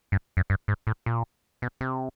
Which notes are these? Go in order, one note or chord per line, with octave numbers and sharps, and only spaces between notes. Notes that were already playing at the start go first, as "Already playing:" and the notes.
G2
F#2
G2
G#2
A2
A#2
B2
C3